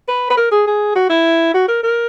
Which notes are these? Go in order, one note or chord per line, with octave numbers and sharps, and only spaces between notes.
B4
B4
A#4
G#4
G#4
F#4
E4
F#4
A#4
A#4